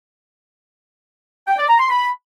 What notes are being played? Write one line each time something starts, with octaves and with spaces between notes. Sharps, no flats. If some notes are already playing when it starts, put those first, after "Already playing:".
G5
D5
A#5
C6
B5